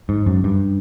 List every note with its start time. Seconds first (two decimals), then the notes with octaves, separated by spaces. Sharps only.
0.09 G#2
0.26 F#2
0.44 G2